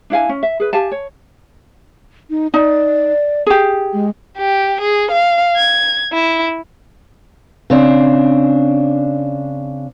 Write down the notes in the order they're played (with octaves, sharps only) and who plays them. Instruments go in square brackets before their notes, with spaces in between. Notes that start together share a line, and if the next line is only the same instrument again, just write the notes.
[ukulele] D4 E4 F5 G#5
C#4
E5
G#4 B4
G4 F5 G#5 A5
C#5
[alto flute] D#4
[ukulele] D#4 [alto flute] D5
[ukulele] G4 G#4
[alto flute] G#3
[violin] G4
G#4
F5
G#6
E4
[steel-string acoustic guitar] C#3 C4 D4